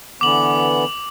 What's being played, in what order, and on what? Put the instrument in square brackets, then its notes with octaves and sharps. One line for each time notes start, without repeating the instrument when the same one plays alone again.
[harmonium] D3 E3 B3 [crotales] D6 F#7